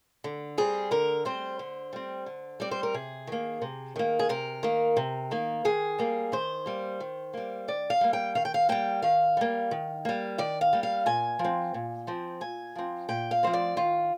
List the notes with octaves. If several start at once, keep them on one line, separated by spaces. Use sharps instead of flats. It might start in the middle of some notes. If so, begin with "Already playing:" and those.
D3
G3 C4 G#4
D3 A#4
G3 C4 C5
D3
G3 C4
D3
G3 C4 D5
C5
A#4
C3 G#4
D#3 A#3
C3
D#3 A#3
G#4
C3 A#4
D#3 A#3
C3
D#3 A#3
D#3 G#4
G3 A#3
D#3 C5
G3 A#3
D#3
G3 A#3
D#3 D5
F5
G3 A#3
G5
D#3 F5
G5
F5
G3 A#3 G5
D#3 F5
G3 A#3
D#3
G3 A#3
D#3 D5
F5
G3 A#3
F5
A#2 G#5
F3
C4
A#2
F3 C4
A#2 G#5
F3 C4
A#2 G5
F5
F3 C4 C5
D5
D#3 F4